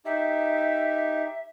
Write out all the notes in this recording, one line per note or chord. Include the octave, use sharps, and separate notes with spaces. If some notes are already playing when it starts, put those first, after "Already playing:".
D#4 G4 E5